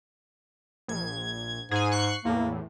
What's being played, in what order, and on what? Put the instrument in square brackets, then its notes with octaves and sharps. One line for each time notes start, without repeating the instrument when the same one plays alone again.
[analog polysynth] A#1 G#6
[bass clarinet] G#2 [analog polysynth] G#4 G#5
[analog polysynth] C#6 F#6 C7
[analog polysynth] E2 A2 [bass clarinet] A#3